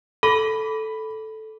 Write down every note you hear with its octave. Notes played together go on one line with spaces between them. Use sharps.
A4 B5